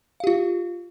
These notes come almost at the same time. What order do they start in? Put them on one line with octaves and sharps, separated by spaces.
F5 G4 F4